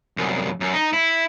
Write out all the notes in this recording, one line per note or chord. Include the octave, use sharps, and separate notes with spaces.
C2 F#2
F#2
D#4
E4